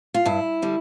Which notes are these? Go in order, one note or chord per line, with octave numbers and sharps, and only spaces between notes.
F4
G2 E4
D3 G3